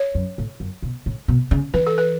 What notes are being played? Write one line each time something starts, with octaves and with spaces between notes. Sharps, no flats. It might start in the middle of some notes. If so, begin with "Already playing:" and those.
Already playing: C#5
F#2
A2
F#2
B2
A2
B2
C#3
E3 B4
A4
B4